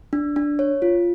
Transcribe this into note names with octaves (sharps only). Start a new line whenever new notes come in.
D4
D4
C#5
F4